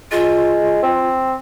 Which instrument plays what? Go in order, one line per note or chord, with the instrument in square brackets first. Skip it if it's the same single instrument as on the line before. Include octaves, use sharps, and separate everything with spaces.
[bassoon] G#3 [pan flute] F4
[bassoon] C4